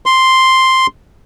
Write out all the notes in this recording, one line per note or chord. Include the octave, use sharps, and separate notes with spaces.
C6